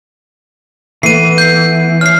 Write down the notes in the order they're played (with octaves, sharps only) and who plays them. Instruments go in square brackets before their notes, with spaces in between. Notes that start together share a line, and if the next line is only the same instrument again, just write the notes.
[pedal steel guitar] E3 [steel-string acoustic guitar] A3 B3 [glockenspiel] C7 D#7
[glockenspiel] G6 C7
[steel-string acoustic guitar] C#4 [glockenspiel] F6 C7